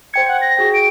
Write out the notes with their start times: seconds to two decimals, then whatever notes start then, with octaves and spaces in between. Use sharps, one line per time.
0.14 C5 G5 G#6 C#7
0.28 F#5
0.42 A#6
0.57 F#4 G#4 G5
0.74 D7